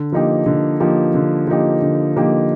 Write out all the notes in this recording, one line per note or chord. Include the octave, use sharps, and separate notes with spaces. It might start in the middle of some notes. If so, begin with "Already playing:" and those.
Already playing: D3
F3 A#3 D#4 G4
D3
F3 A#3 D#4 G4
D3
F3 A#3 D#4 G4
D3
F3 A#3 D#4 G4